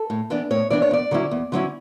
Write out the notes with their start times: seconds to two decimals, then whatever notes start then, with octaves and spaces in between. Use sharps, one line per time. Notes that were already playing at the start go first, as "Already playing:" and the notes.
Already playing: A4
0.10 A2
0.30 E3 B3 D4
0.51 A2 C#5
0.70 E3 B3 D4 D5
0.82 C#5
0.91 E2 D5
1.11 D3 F#3 C#4 E4
1.31 E2
1.52 D3 F#3 C#4 E4